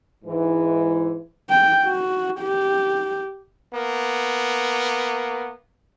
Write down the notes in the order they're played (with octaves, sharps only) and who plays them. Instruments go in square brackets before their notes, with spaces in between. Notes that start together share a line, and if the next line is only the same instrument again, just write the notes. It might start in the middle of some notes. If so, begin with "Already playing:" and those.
[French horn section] G#2 E3
[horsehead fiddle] G5
F#4
G4
[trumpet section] A#3 B3